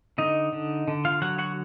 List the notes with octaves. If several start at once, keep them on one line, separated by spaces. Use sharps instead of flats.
D3 D#4 D#5
D3
D3
F4 F5
F#3 F#4 F#5
F#4 F#5